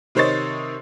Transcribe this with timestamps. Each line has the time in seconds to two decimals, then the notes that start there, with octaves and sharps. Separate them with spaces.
0.15 C3 D#3 C5 C#5 D#5 A6